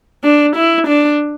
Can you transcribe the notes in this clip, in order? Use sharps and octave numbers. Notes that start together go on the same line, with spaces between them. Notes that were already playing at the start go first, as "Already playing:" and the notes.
D4
E4
D4